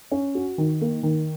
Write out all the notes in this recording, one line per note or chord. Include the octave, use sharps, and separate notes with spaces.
C#4
F#4
D#3
A#3
D#3